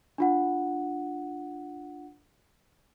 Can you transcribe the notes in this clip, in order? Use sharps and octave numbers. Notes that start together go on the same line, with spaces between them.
D4 F4 F#5